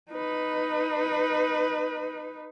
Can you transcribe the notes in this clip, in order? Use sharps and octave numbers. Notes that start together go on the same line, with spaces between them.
D#4 B4